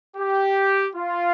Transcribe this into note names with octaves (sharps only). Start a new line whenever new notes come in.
G4
F4